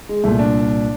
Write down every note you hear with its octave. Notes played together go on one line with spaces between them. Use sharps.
G#3
C2 A#2 A3
D4